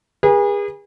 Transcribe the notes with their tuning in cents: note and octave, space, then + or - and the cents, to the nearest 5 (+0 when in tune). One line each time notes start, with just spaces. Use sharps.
G#4 -35 B4 -40